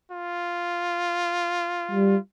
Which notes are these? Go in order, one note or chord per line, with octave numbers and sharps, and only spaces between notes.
F4
G3